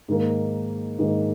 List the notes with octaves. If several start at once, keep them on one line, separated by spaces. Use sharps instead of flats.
G#2 D#3 A#3
G#2 D#3 A#3